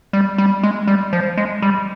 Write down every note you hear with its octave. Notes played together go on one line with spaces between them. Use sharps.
G3
G3
G#3
G3
F3
G#3
G3